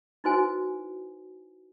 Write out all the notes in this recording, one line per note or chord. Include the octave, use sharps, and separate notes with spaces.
D#4 E4 F#4 B4 C5 G#5